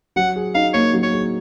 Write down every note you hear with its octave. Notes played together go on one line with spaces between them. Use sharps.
F#3 F#5
G#4
D#4 F5
A#3 C#5
F#3
C#5
G#4